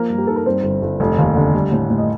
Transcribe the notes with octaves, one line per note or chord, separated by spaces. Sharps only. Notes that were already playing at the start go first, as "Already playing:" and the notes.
Already playing: F3 A#3 A#4
G2
G4
D#4 A4
A#4
G2 C4 C5
G1
G1
F1
D#2
D3
G3
A2
A2
D#5